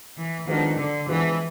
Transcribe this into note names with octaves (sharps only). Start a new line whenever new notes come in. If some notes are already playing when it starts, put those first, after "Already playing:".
E3
D#3 F3 G#3 B3 D4 F#4
D3
E3 F3 G#3 B3 D4 F#4